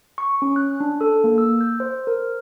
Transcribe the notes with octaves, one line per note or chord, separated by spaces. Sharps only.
C#6
C#4
F#6
D4
A4
A#3
E6
G6
C5
A#4